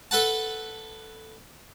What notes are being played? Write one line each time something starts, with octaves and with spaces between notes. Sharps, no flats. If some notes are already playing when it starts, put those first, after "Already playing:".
A4 B4 F#5 A5